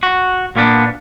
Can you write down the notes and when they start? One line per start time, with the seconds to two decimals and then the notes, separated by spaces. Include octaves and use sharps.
0.03 F#4
0.56 A#2 A#3 B3 D4